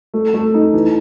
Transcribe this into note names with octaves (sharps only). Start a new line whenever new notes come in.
A3
A3
D#4
E3